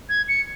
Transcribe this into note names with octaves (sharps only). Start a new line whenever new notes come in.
G#6
C#7